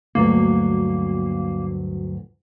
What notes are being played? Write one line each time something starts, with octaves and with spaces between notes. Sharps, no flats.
D2 G2 F#3 A#3